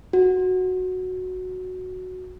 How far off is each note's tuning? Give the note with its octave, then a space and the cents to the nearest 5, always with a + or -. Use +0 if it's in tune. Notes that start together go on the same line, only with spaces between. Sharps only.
F#4 -5